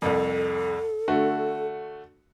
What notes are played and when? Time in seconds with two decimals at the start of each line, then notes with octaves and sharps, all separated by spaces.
0.02 C2 F2 A4
1.08 D3 A3 F#4